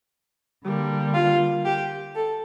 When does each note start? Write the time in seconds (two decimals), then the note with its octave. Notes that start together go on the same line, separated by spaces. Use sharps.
0.63 D3 G3 A#3
1.13 F4
1.64 G4
2.14 A4